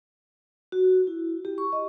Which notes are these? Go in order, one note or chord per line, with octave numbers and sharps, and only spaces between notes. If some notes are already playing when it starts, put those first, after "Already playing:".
F#4
E4
G4
C#6
D#5